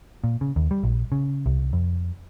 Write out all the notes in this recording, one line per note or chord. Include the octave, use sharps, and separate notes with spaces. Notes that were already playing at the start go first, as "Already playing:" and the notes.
A#2
C#3
D#2
G3
A#1
C#3
C2
F2